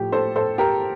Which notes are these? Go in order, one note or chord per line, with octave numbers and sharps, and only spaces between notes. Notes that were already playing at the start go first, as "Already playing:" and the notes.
Already playing: A2 F3 A3 G4
A4 C5
A4 C5
G4 A#4